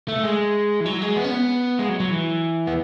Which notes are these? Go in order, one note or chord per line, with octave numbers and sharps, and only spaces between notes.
A3
G#3
E3
F#3
G#3
B3
C#4
B3
G#3
F#3
F#3
E3
B3